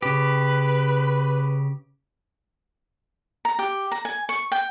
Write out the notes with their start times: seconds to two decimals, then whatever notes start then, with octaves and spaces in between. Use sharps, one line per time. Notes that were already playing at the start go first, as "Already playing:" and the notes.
0.02 C#3 G4 B4
3.45 A#5
3.59 G4
3.92 A#5
4.05 G#5
4.29 C#6
4.52 G5